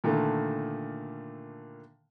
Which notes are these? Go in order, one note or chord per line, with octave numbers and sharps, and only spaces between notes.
A#2 D3 D#3 A3